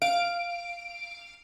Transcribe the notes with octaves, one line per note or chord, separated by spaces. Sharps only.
F5 D7